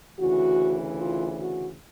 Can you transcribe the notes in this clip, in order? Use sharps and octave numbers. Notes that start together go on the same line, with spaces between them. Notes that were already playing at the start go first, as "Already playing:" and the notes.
D2 C#3 E3 F#4
F4
F#4